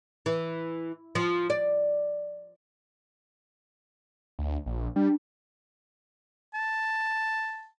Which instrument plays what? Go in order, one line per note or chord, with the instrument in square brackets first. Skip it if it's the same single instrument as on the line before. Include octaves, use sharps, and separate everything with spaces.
[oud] E3
F3
D5
[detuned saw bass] D2
A#1
[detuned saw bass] G3 [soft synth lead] D4
[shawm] A5